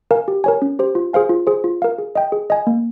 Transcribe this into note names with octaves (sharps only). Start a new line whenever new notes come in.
A#4 F5 G#5
G4
A#4 C#5 G#5
C#4
G4 C5
F4
G#4 C5 F5 G#5
F4
G#4 C5
F4
A#4 F5
G#4
D#5 G5
G#4
D#5 G#5
A#3